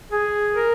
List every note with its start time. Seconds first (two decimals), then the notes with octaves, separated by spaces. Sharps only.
0.11 G#4
0.54 A#4